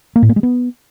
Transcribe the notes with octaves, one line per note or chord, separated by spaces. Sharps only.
A#3
A2
A#3
G#3
B3